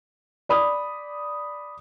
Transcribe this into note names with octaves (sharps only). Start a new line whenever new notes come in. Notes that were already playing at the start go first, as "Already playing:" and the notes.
D5 B5 D#6